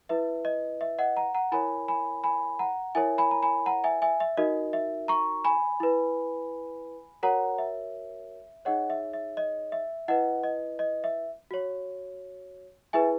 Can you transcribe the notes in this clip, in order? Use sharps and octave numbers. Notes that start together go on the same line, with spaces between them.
E4 B4 E5
D#5
E5
D#5 F#5
F#5 A#5
F#5 A#5
E4 A#4 C#5 G#5 B5
G#5 B5
G#5 B5
F#5 A#5
E4 A#4 C#5 E5 G#5
G#5 B5
A#5
G#5 B5
F#5 A#5
E5 G#5
E5 G#5
E5
D#4 F#4 A#4 D#5
E5
A#5 C#6
G#5 B5
E4 B4
F#4 A#4 C#5 F#5 A#5
E5
D#4 G#4 C#5 D#5 F#5
E5
E5
D#5
E5
E4 B4 D#5 F#5
D#5
D#5
E5
F#4 C#5
E4 G#4 B4 E5 G#5